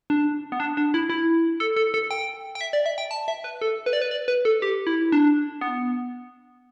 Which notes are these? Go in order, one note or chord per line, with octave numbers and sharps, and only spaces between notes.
D4
B3
D4
D4
E4
E4
A4
A4
A4
G5
G5
E5
D5
E5
G5
A5
E5
B4
A4
B4
D5
B4
D5
B4
A4
G4
E4
D4
B3